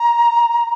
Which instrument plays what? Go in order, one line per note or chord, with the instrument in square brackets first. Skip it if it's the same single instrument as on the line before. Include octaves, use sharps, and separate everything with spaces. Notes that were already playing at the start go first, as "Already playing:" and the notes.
Already playing: [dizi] A#5